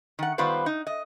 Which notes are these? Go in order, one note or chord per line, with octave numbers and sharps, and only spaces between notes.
D#3 F#5
D#3 G3 B3 F4 B4 C5
D#4
D#5